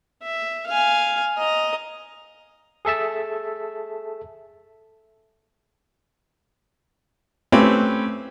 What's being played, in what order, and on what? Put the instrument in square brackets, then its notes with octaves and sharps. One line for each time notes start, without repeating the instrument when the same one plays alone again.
[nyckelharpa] E5
F5 G#5
D#5 A#5
[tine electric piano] G#4 A4 E5 A5
[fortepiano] A3 C4 C#4 G4 B4